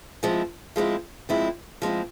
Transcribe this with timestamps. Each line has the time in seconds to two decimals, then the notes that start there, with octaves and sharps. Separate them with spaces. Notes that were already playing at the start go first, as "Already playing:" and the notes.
0.23 F3 G#3 C4 E4
0.76 F3 G#3 C4 E4
1.29 F3 G#3 C4 E4
1.82 F3 G#3 C4 E4